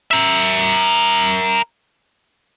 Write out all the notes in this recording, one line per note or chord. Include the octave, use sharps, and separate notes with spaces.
A#4 E5